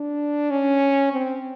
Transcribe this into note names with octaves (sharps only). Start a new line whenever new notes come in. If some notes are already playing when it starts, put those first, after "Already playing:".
Already playing: D4
C#4
C4